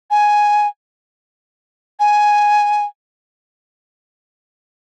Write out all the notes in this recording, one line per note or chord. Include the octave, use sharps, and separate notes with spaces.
G#5
G#5